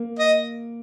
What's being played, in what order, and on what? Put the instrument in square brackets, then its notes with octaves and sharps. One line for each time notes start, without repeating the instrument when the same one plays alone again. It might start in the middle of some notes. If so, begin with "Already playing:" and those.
Already playing: [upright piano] A#3
[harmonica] D#5